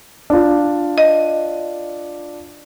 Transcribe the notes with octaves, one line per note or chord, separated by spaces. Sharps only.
D4 F4
D#5